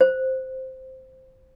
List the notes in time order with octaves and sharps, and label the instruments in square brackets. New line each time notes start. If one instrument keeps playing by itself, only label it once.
[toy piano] C5